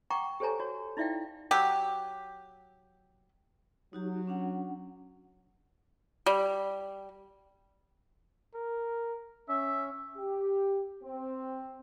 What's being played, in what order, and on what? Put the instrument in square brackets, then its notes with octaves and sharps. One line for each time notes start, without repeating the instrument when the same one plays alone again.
[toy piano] F#5 G5 A#5 C#6 D6
G4 A4 C5 C#5 G#5 A#5
F#4 C#5
D#4 E4 D5 E5 F5 G5
[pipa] F#3 G4
[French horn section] F#3 [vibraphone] D#4 F#4 G4
[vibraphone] C#4 D4 F#5
[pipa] G3
[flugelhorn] A#4
[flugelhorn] C#4 [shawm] E5
[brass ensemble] G4
C4